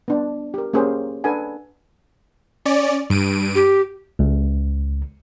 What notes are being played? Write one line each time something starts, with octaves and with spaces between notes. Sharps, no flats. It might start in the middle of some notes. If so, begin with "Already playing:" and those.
B3 D4
G4 A#4
A#3 C#4 G4 G#4 A#4 C5
D4 A4 B4 F#5 G#5
C#4 D5
G2 D7 D#7
G4
C#2